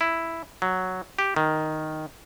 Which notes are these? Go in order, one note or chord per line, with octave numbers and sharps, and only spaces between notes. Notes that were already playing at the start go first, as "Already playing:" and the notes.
E4
F#3
G4
D#3